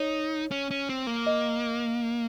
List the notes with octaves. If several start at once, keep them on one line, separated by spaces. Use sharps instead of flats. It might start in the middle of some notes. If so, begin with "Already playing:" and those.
Already playing: D#4 C#5
C#4
C#4
C4
A#3
D#5